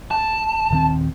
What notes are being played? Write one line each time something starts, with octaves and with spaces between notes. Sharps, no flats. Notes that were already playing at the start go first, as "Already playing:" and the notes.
A5
D#1 D#3 C4